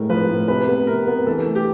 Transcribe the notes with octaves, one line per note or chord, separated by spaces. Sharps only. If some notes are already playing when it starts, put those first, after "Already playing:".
Already playing: A2 G#3 A#4
F3 B4
A2
C3 B4
B3
C3 A#4
B3
E3 A4
A3
G4